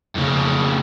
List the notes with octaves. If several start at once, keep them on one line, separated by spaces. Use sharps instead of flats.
F2 C#3